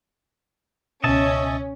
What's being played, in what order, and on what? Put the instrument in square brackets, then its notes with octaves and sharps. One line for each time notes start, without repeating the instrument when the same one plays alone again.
[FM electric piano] C#2 B2 [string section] C#4 [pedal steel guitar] D#5 E5 A5